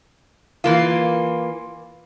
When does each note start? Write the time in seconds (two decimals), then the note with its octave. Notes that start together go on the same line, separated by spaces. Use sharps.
0.64 E3 A#3 F4